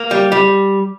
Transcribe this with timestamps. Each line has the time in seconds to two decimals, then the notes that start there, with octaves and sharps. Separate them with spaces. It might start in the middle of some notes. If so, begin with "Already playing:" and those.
Already playing: A#3
0.11 G3
0.32 G3